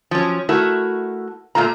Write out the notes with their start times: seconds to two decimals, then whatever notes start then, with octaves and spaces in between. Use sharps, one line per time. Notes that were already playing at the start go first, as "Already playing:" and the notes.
0.11 F3 F#3 C#4
0.49 A3 E4 F#4 A#4
1.55 A#2 C#3 A3 F4 A#5